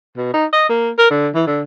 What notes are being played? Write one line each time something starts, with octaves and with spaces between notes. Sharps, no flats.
B2
D#4
D#5
A#3
A#4
D3
E3
D3